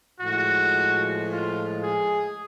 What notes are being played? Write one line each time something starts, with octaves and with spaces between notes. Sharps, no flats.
A2 F3 G#3 F#4
F4
G#4